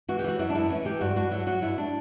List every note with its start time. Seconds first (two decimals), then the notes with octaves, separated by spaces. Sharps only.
0.08 E3 F#4
0.19 G4
0.24 E3 F#4
0.39 F#2 E4
0.50 D4
0.55 F#2 E4
0.70 E3 C#4
0.85 E3 G4
1.01 G2 F#4
1.16 G2 F#4
1.31 F#3 E4
1.47 F#3 F#4
1.62 G2 E4
1.78 D4